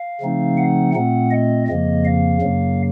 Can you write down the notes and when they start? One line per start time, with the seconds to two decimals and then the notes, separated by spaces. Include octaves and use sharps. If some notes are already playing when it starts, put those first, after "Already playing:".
Already playing: F5
0.21 C#3 F3 A3 C4 D#4
0.57 F#5
0.94 A#2 A3 C4 F#5
1.31 D#5
1.68 F2 C#3 F3 A#3 D#5
2.05 F5
2.42 F#2 C#3 F#3 A#3